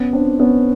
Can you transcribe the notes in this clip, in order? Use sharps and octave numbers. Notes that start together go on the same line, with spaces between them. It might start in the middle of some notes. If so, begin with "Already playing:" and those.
Already playing: B3 C#4
C4 D4
B3 C#4